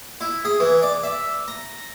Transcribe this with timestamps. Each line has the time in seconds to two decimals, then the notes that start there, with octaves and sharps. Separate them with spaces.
0.21 E4
0.45 G#4
0.60 E3
0.82 D5
1.03 E5
1.48 A#5